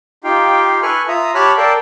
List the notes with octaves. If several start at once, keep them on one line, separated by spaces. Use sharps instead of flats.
D#4 F4 G4 F5 G5
A4 B4 G#5 C#6 F6 F#6
F4 E5 A#5 D#6
G4 C#5 A5 B5 F6 F#6
A4 A#4 D5 F5 G5 A5